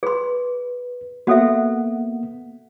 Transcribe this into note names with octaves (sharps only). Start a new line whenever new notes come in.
G#4 B4 C6
A#3 B3 F#4 A4 E5 F#5